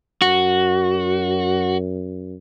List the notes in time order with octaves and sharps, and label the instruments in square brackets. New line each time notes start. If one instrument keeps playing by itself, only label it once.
[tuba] F#2 [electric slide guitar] F#4